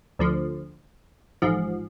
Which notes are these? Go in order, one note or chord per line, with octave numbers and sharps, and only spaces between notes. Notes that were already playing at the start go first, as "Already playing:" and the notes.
D2 D3 F3
A1 G#2 F3